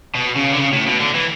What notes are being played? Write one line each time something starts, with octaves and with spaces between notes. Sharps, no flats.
B2
C#3
D3
C#3
A2
B2
D3
E3